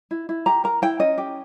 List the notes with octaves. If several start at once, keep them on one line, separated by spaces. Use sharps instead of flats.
E4
E4
G4 A#5
A#4 A#5
E4 G5
C#4 D#5
G4